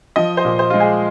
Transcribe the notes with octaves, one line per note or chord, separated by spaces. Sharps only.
F3 D#5
C5
A#2
C5
G#3 F4
G#4